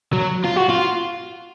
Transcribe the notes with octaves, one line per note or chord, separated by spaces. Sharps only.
F#3
F4
F#4
F4